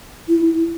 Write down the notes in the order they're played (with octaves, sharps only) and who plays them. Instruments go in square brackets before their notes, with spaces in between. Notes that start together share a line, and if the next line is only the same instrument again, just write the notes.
[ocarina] E4